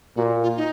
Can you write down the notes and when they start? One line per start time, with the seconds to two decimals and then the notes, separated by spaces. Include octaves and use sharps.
0.16 A#2 F#4
0.43 F4
0.57 D#4